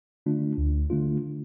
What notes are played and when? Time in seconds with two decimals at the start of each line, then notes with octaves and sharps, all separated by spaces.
0.26 D3 A3 D4 F4
0.58 D2
0.90 D3 A3 D4 F4